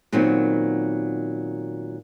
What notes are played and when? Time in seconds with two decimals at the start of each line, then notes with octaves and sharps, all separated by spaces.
0.12 A#2 D#3 F#3 B3 C4